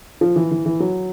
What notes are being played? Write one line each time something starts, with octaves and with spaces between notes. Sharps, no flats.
F3
E3
E3
E3
F#3